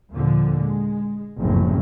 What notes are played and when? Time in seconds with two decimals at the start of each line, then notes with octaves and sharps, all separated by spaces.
0.13 D#2 A#2 D3 F3
0.61 G#3
1.40 F#1 C2 F2 A2 C3